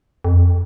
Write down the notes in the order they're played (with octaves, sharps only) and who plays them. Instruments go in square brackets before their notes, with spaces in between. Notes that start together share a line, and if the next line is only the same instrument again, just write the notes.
[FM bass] F2